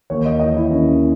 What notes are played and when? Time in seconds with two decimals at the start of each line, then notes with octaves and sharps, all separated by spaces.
0.10 D#2 C#5
0.25 D#5
0.39 E3 D#5
0.56 E4
0.70 D#2 C#4